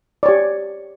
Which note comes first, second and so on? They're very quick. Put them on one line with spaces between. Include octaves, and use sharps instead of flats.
D5 C#5 G4